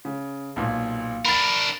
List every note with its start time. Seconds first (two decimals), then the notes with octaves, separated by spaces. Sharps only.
0.05 C#3
0.56 B1 A#2
1.25 D4 A#4 B5 A6